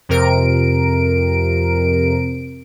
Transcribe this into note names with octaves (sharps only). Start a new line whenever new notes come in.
F2 C3 A#4 D7